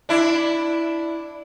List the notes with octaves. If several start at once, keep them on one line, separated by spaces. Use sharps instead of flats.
D4 E4